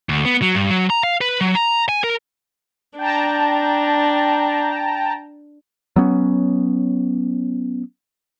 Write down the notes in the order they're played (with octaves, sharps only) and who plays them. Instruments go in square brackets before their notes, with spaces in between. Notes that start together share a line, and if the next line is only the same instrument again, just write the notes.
[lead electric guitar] D2
B3
F#3
G2
F#3
A#5
F5
B4
F#3
A#5
G#5
A#4
[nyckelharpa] D4 [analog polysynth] G5 A5 A#5
[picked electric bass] F#3 B3 C#4